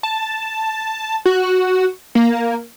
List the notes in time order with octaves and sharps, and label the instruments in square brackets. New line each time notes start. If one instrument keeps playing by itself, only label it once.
[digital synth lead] A5
F#4
A#3